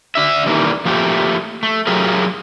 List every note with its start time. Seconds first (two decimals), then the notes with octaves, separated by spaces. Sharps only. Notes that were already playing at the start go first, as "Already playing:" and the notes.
0.15 D3 D4 E5
0.46 D#3 E3 G3 A#3
0.85 F3 A3 A#3 G4
1.63 A3
1.87 F#3 A3 F4 G4 G#4 A#4